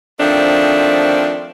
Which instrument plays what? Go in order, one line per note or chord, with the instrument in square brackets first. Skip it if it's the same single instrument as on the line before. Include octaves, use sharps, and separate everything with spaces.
[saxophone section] D#3 F3 A3 C4 D4